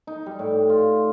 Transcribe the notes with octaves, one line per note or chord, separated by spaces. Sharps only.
D#4
G3
A2
F4